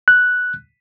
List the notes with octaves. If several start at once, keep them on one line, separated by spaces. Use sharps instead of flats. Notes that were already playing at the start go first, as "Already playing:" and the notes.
F#6